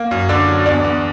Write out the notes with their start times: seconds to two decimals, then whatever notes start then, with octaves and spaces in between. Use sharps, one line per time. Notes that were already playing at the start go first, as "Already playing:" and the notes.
Already playing: A#3
0.11 F#2
0.29 D3 D4 D5
0.48 F#3
0.66 E2 D4 D5
0.84 E2